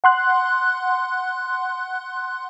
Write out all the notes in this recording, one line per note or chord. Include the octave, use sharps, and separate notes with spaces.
F#5 C6 F#6